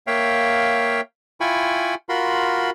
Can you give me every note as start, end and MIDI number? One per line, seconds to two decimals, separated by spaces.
0.07 1.01 58
0.07 1.01 73
0.07 1.01 76
0.07 1.01 77
0.07 1.01 79
1.41 1.95 64
1.41 1.95 65
1.41 1.95 79
1.41 1.95 80
1.41 1.95 83
1.41 1.95 85
2.09 2.70 65
2.09 2.70 66
2.09 2.70 70
2.09 2.70 83
2.09 2.70 84